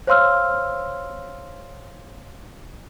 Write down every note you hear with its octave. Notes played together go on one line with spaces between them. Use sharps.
C5 C#5 F5 C6 E6 F6